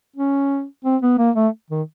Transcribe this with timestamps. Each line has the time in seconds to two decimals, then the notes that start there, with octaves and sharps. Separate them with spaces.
0.16 C#4
0.84 C4
1.02 B3
1.18 A#3
1.36 A3
1.70 D#3